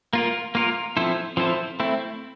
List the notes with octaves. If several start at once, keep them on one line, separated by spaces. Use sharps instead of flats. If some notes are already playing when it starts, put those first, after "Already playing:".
A#3 F4 A#4
A#3 F4 A#4
F3 C4 E4 A4 C5
F3 C4 E4 A4 C5
A3 C4 E4